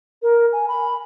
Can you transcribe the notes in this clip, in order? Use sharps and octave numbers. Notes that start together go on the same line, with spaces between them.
A#4
G#5
B5